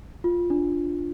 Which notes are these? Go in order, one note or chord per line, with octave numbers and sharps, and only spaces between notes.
F4
D4